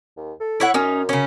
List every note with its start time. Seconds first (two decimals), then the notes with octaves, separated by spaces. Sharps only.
0.17 D#2
0.40 A4
0.60 E4 C#5 F#5
0.74 F#2 C#4 D#4
1.09 C#3 C#4